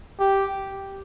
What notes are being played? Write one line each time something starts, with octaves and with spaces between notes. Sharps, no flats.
G4